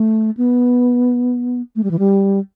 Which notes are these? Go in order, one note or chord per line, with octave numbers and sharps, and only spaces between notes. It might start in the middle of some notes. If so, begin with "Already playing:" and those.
Already playing: A3
B3
A3
G3
E3
G3